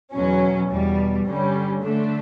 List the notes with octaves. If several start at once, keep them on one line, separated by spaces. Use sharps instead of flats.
E2 B2 F#3 C#4
E2 B2 G3
G2 D3 G3 C#4
D3 A3 D4